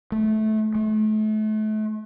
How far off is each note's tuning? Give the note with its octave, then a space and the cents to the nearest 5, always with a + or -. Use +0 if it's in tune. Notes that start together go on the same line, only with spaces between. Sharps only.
A3 -20
A3 -35